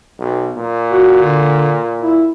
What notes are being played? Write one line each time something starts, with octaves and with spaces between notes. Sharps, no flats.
B1
A#2
F#4
D3
E4